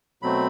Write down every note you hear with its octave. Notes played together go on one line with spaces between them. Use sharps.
B2 F#3 A3 C4 B5